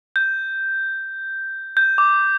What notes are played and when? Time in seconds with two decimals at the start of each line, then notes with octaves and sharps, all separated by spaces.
0.16 G6
1.77 G6
1.98 D6